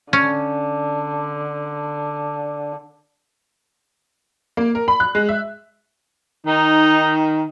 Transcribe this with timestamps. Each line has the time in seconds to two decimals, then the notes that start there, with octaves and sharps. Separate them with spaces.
0.13 D3 C#4
4.57 A#3
4.75 A#4
4.88 B5
5.00 F#6
5.15 G#3
5.29 E5
6.46 D#3 D#4